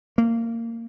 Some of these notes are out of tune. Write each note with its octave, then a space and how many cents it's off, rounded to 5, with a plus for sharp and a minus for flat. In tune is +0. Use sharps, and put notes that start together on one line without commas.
A#3 -20